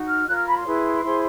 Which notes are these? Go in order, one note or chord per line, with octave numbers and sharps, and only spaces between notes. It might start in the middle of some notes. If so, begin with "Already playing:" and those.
Already playing: D#4 F#4
F6
F4 A#4 C#5 F#6
F6
B5
C6
E4 G#4 B4
E4 G#4 C5